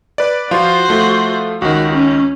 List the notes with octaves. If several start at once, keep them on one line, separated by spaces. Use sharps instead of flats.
B4 D5
F3 F4 F#4 C5
F3 A3 F4
C#2 D#3 F#4
C#4